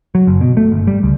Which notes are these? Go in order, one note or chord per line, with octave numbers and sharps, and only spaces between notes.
F#3
F#1
B2
A3
G1
G3
C#2